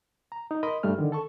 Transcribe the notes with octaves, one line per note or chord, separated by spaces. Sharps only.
A#5
D#4
A#4 D#5 B5 C6
G2 G3 A3 F6
D3 D#3
A4 A5 C#6